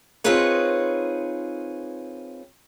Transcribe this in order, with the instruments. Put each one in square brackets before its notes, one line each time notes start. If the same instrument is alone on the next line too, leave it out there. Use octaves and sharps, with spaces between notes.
[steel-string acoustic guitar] C4 D#4 F4 G#4 B4 C#5